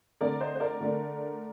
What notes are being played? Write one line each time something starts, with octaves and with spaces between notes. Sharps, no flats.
D3 A3 C4 A#4 D5
C5 D#5
C5
A#4 D5
D3 A3 D4